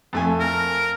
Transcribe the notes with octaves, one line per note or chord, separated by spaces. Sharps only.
F2 A3 G#5
A#4